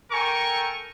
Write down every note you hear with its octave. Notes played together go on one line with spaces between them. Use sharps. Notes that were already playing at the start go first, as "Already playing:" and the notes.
A4 A#4 G5 G#5 C#6